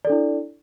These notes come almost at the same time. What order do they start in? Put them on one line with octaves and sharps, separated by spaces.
D5 A4 D4 E4